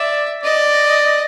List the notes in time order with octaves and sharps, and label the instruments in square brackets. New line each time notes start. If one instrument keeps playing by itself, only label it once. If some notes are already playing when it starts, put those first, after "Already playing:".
Already playing: [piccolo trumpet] D5 [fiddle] E5
[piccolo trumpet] D5 [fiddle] D#5